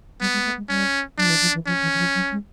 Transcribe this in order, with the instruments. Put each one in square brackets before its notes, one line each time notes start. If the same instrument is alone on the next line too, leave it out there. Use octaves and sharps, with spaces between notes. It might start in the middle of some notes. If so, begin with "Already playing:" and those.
[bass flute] G3 [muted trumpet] B3
[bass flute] G#3
A3
G#3
[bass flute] G3 [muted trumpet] C#4
[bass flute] F#3 [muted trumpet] D4
[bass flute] F3
E3
F3
E3
[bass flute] F3 [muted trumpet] C#4
[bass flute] E3
E3
F3
F#3
G#3